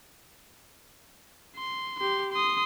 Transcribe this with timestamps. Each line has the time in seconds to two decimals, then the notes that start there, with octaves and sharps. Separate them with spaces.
1.56 C6
2.00 G4 C6
2.33 C6 D#6